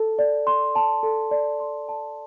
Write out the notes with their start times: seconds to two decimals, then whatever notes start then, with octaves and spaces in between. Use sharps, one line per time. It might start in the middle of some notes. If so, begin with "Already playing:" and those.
Already playing: A4 A5
0.19 D5
0.47 C6
0.76 A5
1.03 A4
1.31 D5
1.60 C6
1.89 A5